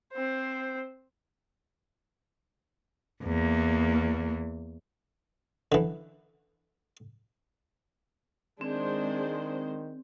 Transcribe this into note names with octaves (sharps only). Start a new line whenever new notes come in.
C4 C5
E2 A#3
D3 E3
D#3 G#3 C4 D4 C5